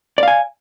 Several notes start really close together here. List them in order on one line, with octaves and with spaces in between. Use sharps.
D5 F5 G#5